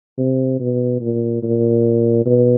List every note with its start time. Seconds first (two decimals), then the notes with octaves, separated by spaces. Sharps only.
0.18 C3
0.59 B2
1.01 A#2
1.43 A#2
2.25 B2